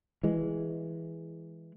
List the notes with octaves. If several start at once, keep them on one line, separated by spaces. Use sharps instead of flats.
E3 G#3